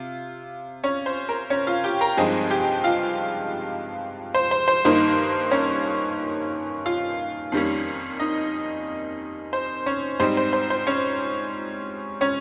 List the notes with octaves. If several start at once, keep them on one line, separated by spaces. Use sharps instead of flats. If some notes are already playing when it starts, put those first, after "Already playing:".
Already playing: C3 F4
C#4 C#5
C5
A#4
C#4 C#5
F4 F5
G4 G5
A#4 A#5
G2 F3 G#3 C4 D#4 G#4 G#5
G4 G5
F4 F5
C5
C5
C5
G2 D#3 A#3 D#4 C5
C#4 C#5
F4 F5
F2 D#3 G3 A#3 C#4
D#4 D#5
C5
C#4 C#5
G#2 G3 C4 D#4 C5
C5
C5
C5
C#4 C#5
C#4 C#5